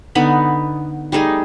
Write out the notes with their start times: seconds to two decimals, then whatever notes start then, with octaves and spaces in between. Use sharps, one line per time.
0.15 D3 B3 D#4 B5
1.12 G3 A3 D#4 G#4